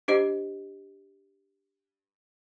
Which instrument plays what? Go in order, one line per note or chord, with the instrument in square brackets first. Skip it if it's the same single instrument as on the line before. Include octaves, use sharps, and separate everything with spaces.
[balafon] D4 G4 C5 D#5